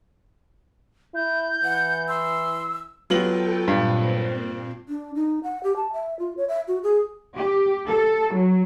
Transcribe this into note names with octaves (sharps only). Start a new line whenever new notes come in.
E4 G6
E3 F#5
C6 E6
F#3 B3 F4 G4 A4 G5 F#7
G2 A#2 C4
D4
D#4
F#5
G4
A5
E5
F4
C#5
E5
F#4
G#4
G4
A4
F#3